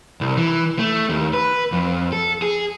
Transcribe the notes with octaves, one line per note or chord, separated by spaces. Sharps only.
C2
E3
A3
D#2
B4
F2
A4
G#4